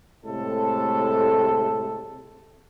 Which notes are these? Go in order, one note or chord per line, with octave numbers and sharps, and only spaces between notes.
A2 C3 G#3 A3 A4